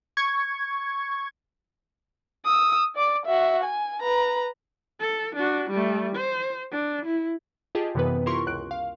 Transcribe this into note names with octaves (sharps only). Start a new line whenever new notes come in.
C#6 G#6
D#6 E6
D5 D6
F#4 E5
G#5
B4 A#5
A4
D4 F#4
G3 A3
C5
D4
E4
F4 G4 G#4 D#5 A5
F#2 C3 E3 B3 D#4 B4
E4 F4 G4 A#4 C6 C#6
C#2 F#6 D7
F5